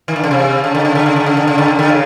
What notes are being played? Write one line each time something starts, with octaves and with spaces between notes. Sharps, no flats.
D#3
D3
C#3
C3
C#3
D3
C#3
D3
C#3
D3
C#3
D3
C#3
D3
C#3
D3
C#3